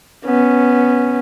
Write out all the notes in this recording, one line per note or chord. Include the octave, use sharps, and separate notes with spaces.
B3 C#4